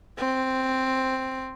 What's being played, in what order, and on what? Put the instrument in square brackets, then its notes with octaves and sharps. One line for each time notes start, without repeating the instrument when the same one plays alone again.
[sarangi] C4